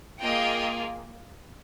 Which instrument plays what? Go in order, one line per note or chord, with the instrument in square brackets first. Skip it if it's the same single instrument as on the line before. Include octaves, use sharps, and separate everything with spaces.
[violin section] A#3 F4 G#4 D#5 G5